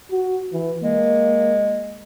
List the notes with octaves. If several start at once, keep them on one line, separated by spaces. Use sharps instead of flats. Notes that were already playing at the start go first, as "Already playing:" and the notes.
F#4
E3
G#3 A#3